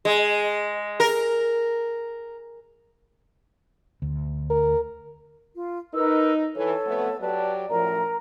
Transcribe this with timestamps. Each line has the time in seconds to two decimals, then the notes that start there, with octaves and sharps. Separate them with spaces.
0.05 G#3
1.00 A#4
4.02 D2
4.50 A#4
5.54 F4
5.94 D#4 A#4 B4 E6
6.55 E3 A4 C#5
6.85 F2 A3 B3
7.21 F#3 G4 B4 D5 A5
7.70 F#2 A2 F3 A#4 A#5